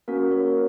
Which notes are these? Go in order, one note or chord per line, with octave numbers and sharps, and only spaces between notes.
A#3 C#4 F#4 A#4
A#4 C#5